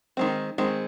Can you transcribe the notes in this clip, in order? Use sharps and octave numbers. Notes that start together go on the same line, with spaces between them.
D#3 G#3 C4
D#3 G#3 C4